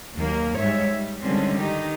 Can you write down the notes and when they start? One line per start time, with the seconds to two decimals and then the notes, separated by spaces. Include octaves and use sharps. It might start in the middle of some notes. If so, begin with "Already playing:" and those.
0.15 D#2 F#3 A#3
0.58 G#2 G3 C#5 E5
0.93 G3
1.22 D3 D#3 G3 G#3 C4 C#4
1.59 D#3 D#4 G4